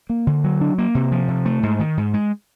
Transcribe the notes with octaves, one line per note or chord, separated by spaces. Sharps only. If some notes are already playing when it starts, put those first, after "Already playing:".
A#3
D3
F#3
D4
A#3
C3
F3
C3
A3
G#2
D#3
G#2
G#3